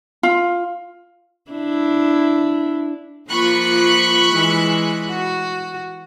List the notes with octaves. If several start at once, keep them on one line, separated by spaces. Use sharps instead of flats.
F4
D4 E4
F3 A#3 F4 B5 C#6 F#6
E3 G#3
F#4